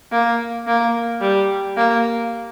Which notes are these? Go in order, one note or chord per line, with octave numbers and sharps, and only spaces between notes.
A#3
A#3
G3
A#3